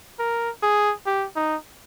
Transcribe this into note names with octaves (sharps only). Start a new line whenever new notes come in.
A#4
G#4
G4
D#4